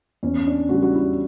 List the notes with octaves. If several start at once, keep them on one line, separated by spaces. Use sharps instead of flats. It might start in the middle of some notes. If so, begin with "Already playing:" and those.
E2 C#4
D4
C#3 G3 F#4
F#4
E4